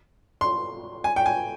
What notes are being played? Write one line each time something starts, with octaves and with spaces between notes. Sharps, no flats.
C6
G#5
G5
G#5